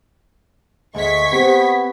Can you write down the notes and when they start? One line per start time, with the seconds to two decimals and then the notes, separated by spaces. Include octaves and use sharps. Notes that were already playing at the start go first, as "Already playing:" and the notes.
0.95 D2 G#3 C#6 G#6 B6
1.32 B3 C4 G4 B4